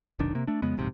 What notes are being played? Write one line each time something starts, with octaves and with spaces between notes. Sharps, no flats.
F1 B1 D#3 D4
C3 A#3
A3 D4
F2 C#3 G#3 B3
D1 A#1 G#2 C3